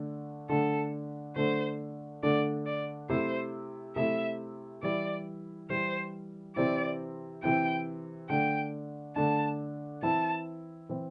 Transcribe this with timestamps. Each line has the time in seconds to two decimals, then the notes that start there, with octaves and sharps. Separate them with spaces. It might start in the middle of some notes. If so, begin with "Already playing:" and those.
Already playing: D3 A3 D4
0.49 D3 A3 D4 A4
1.36 D3 A3 D4 C5
2.23 D3 A3 D4 D5
2.66 D5
3.09 C3 A3 E4 C5
3.96 C3 A3 E4 E5
4.83 E3 G3 E4 D5
5.70 E3 G3 E4 C5
6.56 C3 E3 C4 E4 D5
7.43 C3 E3 C4 E4 G5
8.29 D3 A3 D4 G5
9.16 D3 A3 D4 A5
10.02 E3 C4 E4 A5
10.89 E3 C4 E4